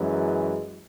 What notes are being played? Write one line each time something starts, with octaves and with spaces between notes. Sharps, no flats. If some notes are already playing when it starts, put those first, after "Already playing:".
Already playing: F#2 E3 G#3